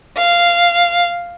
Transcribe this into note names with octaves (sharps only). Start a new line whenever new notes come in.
F5